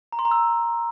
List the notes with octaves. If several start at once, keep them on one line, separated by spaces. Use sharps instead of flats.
A#5
C6
A#5
E6